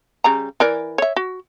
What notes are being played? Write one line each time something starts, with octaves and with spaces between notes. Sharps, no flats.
C#3 G3 A#5
E3 A#4 D5
C#5 E5
F#4